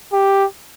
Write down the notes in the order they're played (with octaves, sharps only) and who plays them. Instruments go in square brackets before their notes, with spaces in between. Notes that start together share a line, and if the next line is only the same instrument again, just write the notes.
[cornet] G4